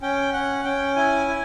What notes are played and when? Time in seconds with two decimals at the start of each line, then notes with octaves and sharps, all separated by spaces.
0.02 C#4 G5
0.33 C#4 F#5
0.64 C#4 G5
0.96 E4 G#5
1.28 E4